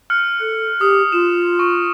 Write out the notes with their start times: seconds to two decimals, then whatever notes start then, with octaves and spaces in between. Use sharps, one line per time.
0.10 F6 F#6 C#7
0.41 A4 F#6
0.81 G4 D#6
1.12 F4 E7
1.59 C#6